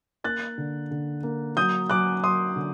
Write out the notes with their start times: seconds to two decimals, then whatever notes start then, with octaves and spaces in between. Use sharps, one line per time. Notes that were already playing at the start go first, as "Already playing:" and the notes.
0.24 A#3 F#6 A6
0.58 D3
0.91 D3
1.23 A#3
1.57 F#3 D#6 G6
1.90 F#3 D6 F#6
2.24 F#3 C6 D#6
2.56 D3